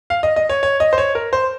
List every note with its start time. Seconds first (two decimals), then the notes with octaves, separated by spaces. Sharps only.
0.10 F5
0.23 D#5
0.36 D#5
0.49 C#5
0.63 C#5
0.80 D#5
0.93 C5
0.98 C#5
1.15 A#4
1.33 C5